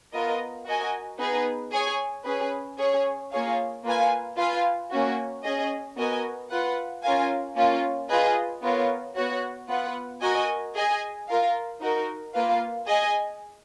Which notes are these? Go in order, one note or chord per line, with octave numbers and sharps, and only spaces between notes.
B3 F4 A#4 D#5
F#4 A#4 D#5 G#5
B3 D#4 G#4 B4
G#4 C#5 G#5
C#4 G#4 B4
C#4 G#4 C#5
A#3 F4 G#4 C#5 F5
A#3 F4 B4 F5 G#5
F4 B4 F5 G#5
A#3 C#4 F#4
C#4 G#4 D#5
B3 F#4 A#4 D#5 G#5
F4 B4 F#5
C#4 F4 A#4 F5 G#5
A#3 C#4 F4
F4 G#4 B4 D#5
B3 F4 A#4 C#5 F5
B3 F#4 C#5 F#5
B3 F4 B4 F#5
F#4 A#4 D#5 G#5
G#4 D#5 G#5
F4 A#4 F5
D#4 F#4 A#4
A#3 F4 B4 F5
G#4 D#5 G#5